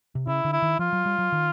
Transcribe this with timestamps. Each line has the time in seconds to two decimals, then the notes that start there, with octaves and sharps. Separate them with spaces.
0.15 C3
0.27 C#3 E4
0.45 D3
0.53 E4
0.62 D#3
0.79 F3 F4
0.93 F#3
1.06 G3
1.19 F#3
1.32 D#3